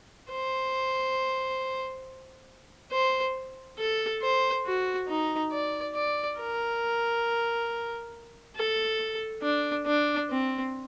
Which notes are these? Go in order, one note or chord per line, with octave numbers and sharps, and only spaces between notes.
C5
C5
A4
C5
F#4
D#4
D5
D5
A#4
A4
D4
D4
C4